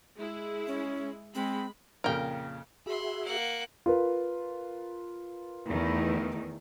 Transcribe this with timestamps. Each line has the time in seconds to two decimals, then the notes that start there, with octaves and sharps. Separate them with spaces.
0.16 G#3 E4 G#4
0.67 C#4
1.35 G#3 C4 B5
2.04 F2 A#2 C#3 A#4 G5
2.86 F#4 G#4 E5 B5 C6
3.25 A#3 F#5
3.86 F4 A#4 B4
5.67 E2 D#3 A3